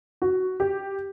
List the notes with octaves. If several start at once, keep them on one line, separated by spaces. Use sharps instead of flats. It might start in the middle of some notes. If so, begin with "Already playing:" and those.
F#4
G4